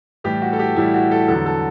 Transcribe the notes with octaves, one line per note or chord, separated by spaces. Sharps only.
A2 E3 G3 G4
F#4
A4
G4
A2 E3 G3 E4
F#4
A4
E2 D3 F#3 A4
A4